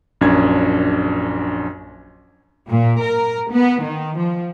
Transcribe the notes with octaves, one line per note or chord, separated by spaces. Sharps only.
A#1 F#2 C#4 D4 G#6
A#2
A#4
B3
D#3
F3